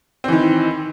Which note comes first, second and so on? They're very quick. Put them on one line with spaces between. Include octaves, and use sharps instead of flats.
C4 E3 D#3